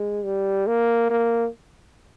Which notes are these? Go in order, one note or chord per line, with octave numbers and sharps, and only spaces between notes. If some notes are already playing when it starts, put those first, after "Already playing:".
Already playing: G#3
G3
A#3
A#3